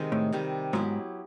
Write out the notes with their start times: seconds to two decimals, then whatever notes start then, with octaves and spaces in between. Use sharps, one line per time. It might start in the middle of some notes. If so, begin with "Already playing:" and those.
Already playing: C3 D#3 G#3
0.12 A2
0.32 C3 D#3 G3
0.73 G#2 F#3 B3 E4 G4